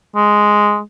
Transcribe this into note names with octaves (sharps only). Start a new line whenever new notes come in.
G#3